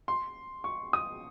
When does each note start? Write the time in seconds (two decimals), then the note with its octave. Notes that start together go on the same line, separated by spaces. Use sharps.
0.08 C6
0.64 C#6
0.93 D#6